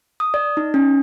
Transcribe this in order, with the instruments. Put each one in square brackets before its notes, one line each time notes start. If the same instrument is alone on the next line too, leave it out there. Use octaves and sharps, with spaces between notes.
[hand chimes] D#6
D5
D#4
C#4